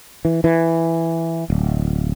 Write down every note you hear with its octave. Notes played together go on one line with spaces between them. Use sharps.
E3
E3
D1